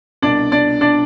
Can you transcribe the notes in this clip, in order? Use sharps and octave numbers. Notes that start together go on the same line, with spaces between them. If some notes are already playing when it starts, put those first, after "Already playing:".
C2 B2 D4 D5
D4 D5
D4 D5